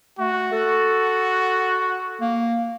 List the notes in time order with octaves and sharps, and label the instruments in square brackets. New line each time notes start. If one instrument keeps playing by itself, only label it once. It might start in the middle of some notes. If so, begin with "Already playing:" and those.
[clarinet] A3 [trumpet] F#4
[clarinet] A4
A#3